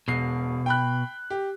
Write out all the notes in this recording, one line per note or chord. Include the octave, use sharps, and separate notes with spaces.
E1 B2 C7
G5 B5 F#6
G4